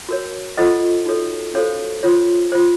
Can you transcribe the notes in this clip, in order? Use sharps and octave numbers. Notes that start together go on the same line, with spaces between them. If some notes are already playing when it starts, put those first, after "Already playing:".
F#4 A#4 C#5
F4 A4 C5 D#5 F#5
D#4 F#4 A4 C#5
C#4 F#4 A4 C5 C#5 F5
F4 C5 C#5
F4 C5